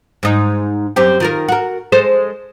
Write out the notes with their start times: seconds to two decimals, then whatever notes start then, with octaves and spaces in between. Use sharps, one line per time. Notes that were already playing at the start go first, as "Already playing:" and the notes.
0.23 G#2 D#4
0.96 F#2 C4 G4
1.20 D#3 F4 A#4
1.48 F#4 A#4
1.92 G#3 A4 C5